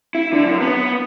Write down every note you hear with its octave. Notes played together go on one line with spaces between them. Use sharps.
E4
D3
F#2
B3